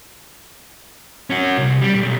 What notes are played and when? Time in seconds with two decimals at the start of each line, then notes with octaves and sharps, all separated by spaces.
1.30 C#4 F#4
1.58 C2
1.81 G3
1.95 B1